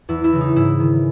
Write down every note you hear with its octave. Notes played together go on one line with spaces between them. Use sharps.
E2 E4
E4
C#3 E3
D#4
G#2 E4
D#3